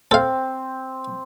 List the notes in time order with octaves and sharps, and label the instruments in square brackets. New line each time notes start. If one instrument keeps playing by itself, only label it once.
[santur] C4 [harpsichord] A4 F5